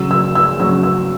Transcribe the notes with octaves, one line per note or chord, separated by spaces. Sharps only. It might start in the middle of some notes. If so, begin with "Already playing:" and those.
Already playing: C#3 F#3 E6
E6
E6
C#3 F#3 E6
E6